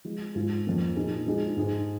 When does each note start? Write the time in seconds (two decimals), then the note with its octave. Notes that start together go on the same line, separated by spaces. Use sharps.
0.05 F3 G#3 F4
0.35 G#2 G#3 F4 G#4
0.66 F2 F3 A#3 C#4
0.96 A#2 A#3 D#4 G#4
1.26 F3 G#3 D#4 G#4
1.57 G#2 G#3 D#4 G#4